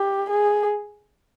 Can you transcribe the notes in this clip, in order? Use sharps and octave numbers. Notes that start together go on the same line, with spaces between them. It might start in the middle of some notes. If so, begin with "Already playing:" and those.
Already playing: G4
G#4